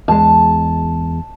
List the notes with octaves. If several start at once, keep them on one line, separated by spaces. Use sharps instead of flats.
E2 G#3 A5